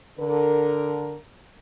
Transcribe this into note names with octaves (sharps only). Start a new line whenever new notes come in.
D3 A#4